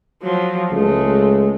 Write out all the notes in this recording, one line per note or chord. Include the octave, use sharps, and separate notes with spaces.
F3 F#3
C#2 G#3 A3